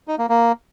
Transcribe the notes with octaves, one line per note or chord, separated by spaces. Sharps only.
D#4
A#3
A#3